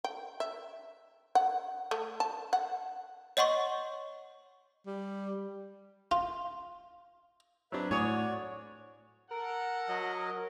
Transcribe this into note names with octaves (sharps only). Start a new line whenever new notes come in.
G5
E5
F#5
A3
A5
F#5
C#5 D#5 F#5 C6 C#6
G3
F4
F#3 C4 D4 B4 E5
A2 F#4 C#5 D5 G#5 D6 D#6
A4 A#4 F#5
F#3 D#5